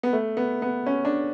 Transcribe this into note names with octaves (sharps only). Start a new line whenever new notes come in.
B3
A3
B3
B3
C#4
D4